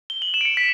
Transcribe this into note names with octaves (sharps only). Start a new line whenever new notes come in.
G7
F#7
E7
D7
C#7
B6